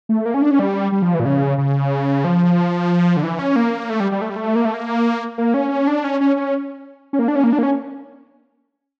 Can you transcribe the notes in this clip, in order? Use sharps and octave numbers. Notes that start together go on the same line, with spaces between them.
A3
A#3
C#4
D4
C#4
G3
G3
F3
E3
A#2
C#3
C#3
F3
D3
E3
C#4
A#3
A3
G3
G3
A3
G3
A3
A#3
A3
A#3
A#3
C#4
D4
C#4
C#4
C#4
C#4
A#3
D4
C#4
A#3
D4
A#3
C#4